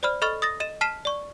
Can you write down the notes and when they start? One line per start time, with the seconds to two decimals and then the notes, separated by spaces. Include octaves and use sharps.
0.03 C5 D5 B5 F6
0.22 A4 D#5 B5 C#6 F6 A6
0.42 D#6 A6 A#6
0.60 D#5 D#7 E7
0.81 A5 F6 B6 C7 D#7 E7
1.05 D5 C#6